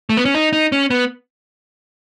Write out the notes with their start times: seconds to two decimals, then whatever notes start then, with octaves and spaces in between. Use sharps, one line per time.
0.10 A3
0.17 B3
0.25 C#4
0.35 D#4
0.53 D#4
0.72 C#4
0.90 B3